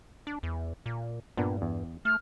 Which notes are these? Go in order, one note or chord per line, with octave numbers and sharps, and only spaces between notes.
D4
E2
A#2
G2 A#2 B3 D4
E2
A3 F6